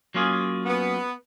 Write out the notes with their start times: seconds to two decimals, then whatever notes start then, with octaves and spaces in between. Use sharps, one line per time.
0.15 F#3 A#3 C#4 F4 G#4
0.66 B3